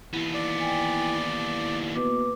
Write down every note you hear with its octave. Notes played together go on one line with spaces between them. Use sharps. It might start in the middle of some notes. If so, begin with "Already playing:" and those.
D#2 E3 B3
D5
G5 G#5
E4
B2 A#3 B4 D6